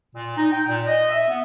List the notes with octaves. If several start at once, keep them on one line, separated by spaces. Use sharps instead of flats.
A#2
D#4
G5
A#2
D#5
E5
B3